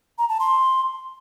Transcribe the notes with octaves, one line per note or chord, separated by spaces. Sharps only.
A#5
A5
C6